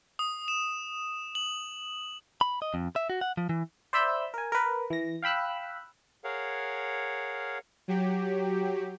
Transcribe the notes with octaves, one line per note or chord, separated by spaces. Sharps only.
D#6
E7
F#7
B5
D#5
F2
E5
F#4
F#5
F3
E3
C5 D5 E5 B5 E6 G6
A#4 G#5
A#4 B4
E3 A#6
F5 G5 B5 E6 F#6
G#4 A#4 C#5 F5 F#5
F#3 G4